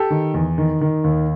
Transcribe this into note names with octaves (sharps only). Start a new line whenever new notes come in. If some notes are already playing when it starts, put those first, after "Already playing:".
Already playing: G4 A4
D#3
E2
D#3
D#3
D#2